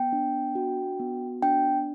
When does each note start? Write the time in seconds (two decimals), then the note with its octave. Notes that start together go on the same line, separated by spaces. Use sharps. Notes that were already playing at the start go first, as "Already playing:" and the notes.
Already playing: B3 G5
0.13 D4
0.55 F#4
1.00 B3
1.43 D4 G5